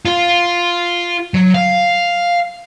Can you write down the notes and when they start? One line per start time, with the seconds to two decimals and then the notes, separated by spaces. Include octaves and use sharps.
0.05 F4
1.34 F#3
1.54 F5